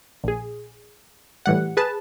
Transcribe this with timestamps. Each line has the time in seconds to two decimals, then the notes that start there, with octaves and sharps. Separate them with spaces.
0.24 A#1 G#4
1.46 A2 E3 G3 F#5
1.77 G#4 B4 A5